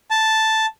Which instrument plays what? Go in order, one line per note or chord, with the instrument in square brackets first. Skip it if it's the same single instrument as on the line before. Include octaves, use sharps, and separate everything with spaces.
[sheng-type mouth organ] A5